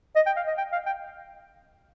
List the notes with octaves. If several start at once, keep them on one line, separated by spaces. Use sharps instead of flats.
D#5
G5
F5
D#5
G5
F5
G5